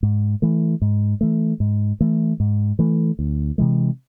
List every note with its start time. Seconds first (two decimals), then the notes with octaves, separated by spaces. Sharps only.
0.03 G#2
0.42 E3 A3
0.82 G#2
1.21 E3 A3
1.60 G#2
2.01 E3 A3
2.40 G#2
2.79 E3 A3
3.19 D2
3.58 C3 E3 G#3